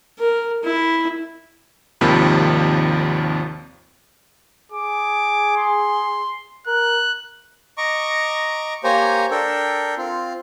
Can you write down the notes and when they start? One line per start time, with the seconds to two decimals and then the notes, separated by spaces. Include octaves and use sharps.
0.19 A#4
0.63 E4
2.01 G#1 D#2 C3 D#3 F3 B5
4.72 G#4 D6
5.57 C6
6.67 A#4 F#6
7.77 D#5 A#5 C#6 D6
8.84 A#3 G4 C5 C#5 G#5 A#5
9.31 D4 A4 A#4 G5
9.98 C4 F4